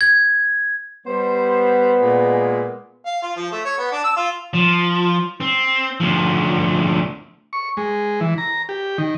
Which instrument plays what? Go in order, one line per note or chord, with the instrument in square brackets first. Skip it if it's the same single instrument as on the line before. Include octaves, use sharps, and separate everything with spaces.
[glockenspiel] G#6
[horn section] G3 C5 [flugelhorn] B3
[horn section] A#2 G#3
[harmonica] F5
F4
F3
A3
C#5
B3
D4
E6
F4
[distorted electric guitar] F3
C4
D2 F3
[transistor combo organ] C#6
G#3
E3
A#5
G4
D#3